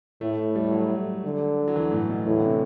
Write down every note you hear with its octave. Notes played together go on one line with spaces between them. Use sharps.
A2 A3
G3
F#3
D3
F#3
E3
A2
B2
A2 E3
D3
C3